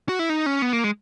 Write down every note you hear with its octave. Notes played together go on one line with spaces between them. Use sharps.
F#4
E4
D#4
C#4
B3
A#3
G#3